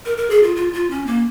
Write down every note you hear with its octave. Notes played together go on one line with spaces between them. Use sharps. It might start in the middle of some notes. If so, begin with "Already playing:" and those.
A#4
A#4
G#4
F4
F4
F4
C#4
A#3